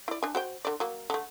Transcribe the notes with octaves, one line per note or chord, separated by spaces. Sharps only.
E4 D5
D4 G#5
F#4 C5 G5
D3 D5
F#3 A#3
D3 A3